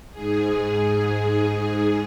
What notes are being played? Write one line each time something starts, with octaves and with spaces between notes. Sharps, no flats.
G#2 G#4